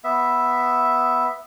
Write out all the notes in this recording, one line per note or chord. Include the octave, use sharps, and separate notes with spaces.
B3 E5